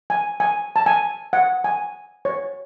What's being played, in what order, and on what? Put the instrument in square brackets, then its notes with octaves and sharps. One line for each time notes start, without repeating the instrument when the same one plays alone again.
[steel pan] G#5
G#5
A5
G#5
F#5
G#5
C#5